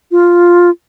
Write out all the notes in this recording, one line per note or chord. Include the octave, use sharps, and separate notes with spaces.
F4